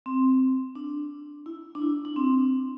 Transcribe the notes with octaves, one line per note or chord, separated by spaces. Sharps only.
C4
D4
E4
D4
E4
D4
C4